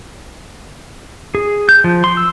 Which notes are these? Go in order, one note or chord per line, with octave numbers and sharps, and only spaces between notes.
G#4
G6
F3
C6
E6